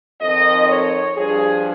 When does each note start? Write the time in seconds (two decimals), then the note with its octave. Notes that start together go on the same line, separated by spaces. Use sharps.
0.20 F2 D#3 D#5
0.68 C#5
1.16 G2 F3 G#4